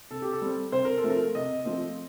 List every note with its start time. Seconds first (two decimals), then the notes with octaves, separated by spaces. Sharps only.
0.11 C3 A4
0.22 G4
0.33 A4
0.42 G3 C4
0.72 C3 C5
0.85 A#4
0.97 A4
1.04 F3 A3 C4
1.10 A#4
1.35 C3 D#5
1.65 F3 A3 C4